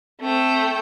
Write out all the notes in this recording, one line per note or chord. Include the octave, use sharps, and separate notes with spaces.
A3 C4 G5